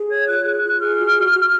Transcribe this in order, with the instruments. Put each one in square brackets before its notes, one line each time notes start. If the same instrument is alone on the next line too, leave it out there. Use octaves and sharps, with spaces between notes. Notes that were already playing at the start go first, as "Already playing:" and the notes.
Already playing: [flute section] G#4
C#5 G#6
F4 F#6
G#4 F#6
F4 F#6
G#4 F6
F#4
F#4
F#4